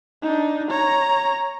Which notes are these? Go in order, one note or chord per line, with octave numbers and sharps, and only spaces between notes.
D4 D#4
C#5 A#5